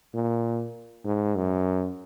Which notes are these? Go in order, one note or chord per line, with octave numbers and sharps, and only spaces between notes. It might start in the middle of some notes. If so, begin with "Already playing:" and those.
A#2
G#2
F#2